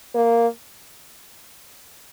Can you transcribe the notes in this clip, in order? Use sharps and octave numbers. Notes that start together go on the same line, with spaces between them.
A#3